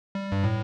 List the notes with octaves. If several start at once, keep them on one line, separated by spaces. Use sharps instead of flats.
G3
G2
A2